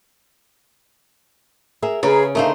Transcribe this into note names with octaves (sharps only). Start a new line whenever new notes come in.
G#4 A#4 E5
C#3 G#4 B4 C#5 A#5
D3 A3 D#4 A#4 C5 F5